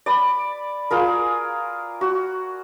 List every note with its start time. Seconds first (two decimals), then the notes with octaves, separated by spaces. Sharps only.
0.06 D5 B5
0.91 F4 G#4 A#4
2.01 F#4